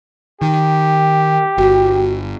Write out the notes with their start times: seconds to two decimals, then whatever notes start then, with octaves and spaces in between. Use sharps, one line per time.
0.42 D#3 G4
1.58 G1 F#4